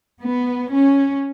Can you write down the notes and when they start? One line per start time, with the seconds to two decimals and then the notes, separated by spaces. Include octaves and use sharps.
0.22 B3
0.71 C#4